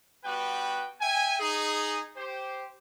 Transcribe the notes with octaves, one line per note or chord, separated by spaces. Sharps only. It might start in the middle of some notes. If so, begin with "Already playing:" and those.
G3 B3 F#4 B4 G5
E5 G5 G#5
D#4 G#4
G4 C5